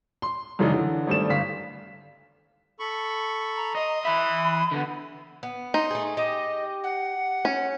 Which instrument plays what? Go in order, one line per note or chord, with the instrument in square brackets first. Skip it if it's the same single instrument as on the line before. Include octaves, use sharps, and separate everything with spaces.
[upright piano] C6
F#2 C#3 E3 G#3 D4 D#4
D3 E3
G#1 G3 A3 D5 E7
G1 F5 B6
[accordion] A4 B5 C#6
[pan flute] A#5
[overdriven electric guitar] D#5 [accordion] C6 D#6
[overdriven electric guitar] E3 E5 [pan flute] B5
[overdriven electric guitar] D3 B3
[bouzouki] B3
[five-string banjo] D#4 [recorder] C6
[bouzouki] A3 G#4
[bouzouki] G4 [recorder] D#5
[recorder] F#5
[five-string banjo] C#4